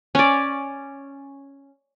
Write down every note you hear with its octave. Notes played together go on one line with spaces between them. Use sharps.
C#4 D5